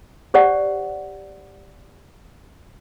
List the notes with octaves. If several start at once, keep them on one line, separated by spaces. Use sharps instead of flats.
G4 C5 D5 F#5